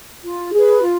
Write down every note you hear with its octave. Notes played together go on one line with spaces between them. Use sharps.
F4
G#4 B4
F4